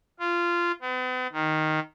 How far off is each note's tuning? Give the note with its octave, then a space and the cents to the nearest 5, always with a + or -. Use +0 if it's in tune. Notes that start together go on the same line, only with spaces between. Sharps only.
F4 -15
B3 +45
D#3 +0